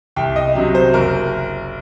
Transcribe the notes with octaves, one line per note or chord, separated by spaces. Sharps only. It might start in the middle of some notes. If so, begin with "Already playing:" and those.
C2 G5
D#5
C3 F#3
C5
F#1 A#4